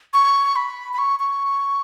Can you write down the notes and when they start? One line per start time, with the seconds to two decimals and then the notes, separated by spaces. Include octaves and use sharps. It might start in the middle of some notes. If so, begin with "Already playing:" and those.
0.14 C#6
0.56 B5
0.93 B5
0.98 C#6
1.20 C#6